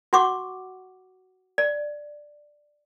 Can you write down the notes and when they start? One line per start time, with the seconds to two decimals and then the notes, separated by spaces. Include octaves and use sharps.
0.13 F#4 F#5 C#6 D6
1.58 D5